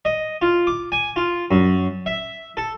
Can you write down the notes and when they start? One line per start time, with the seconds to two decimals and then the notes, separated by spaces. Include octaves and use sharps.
0.05 D#5
0.42 F4
0.67 D6
0.92 G#5
1.16 F4
1.51 F#2
2.06 E5
2.57 A4